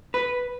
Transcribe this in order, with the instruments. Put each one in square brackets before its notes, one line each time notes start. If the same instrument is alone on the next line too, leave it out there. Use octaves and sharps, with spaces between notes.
[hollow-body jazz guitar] B4